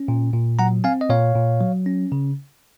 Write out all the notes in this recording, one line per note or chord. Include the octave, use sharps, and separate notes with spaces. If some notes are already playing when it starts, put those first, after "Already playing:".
Already playing: C#4
A#2
A#2
F#3 F#5 A#5
C4 F5 G#5
D#5
A#2 C#5 F5
A#2
F#3
C#4
C#3